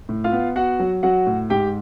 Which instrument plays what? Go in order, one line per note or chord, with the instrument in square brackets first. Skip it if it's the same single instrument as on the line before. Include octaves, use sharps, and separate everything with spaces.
[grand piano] A2
F4 F5
B3
B3 F#4 F#5
F#3
F#3 F#4 F#5
A2
G#2 G4 G5